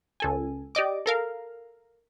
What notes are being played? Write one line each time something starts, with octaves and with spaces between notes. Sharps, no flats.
C#2 A4 G#5
G4 D5 D#5 D6
A4 A#4 F5